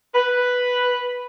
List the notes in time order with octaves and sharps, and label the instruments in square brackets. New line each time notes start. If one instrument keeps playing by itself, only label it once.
[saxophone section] B4